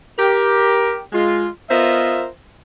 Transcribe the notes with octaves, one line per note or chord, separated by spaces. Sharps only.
G4 A#4
G#3 F4
B3 F4 A#4 C5 D#5 E5